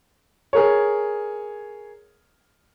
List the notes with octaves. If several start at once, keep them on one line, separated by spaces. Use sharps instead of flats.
G#4 A#4 C#5